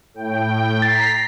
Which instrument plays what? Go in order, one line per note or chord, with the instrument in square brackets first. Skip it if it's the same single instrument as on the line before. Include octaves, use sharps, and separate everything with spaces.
[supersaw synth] A2 G5
[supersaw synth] A#5 B6 C7 [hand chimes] A6